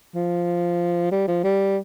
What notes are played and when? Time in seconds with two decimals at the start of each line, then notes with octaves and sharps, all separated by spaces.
0.15 F3
1.11 G3
1.28 F3
1.44 G3